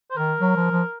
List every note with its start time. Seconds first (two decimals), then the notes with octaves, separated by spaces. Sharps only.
0.11 C5
0.17 D#3 A#4
0.40 F#3
0.56 F3
0.71 F3